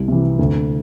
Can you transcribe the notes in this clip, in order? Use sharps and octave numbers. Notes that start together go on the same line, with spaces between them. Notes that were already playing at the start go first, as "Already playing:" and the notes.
Already playing: C2
C3 E3
D2